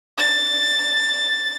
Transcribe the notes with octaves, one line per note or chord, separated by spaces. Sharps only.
A6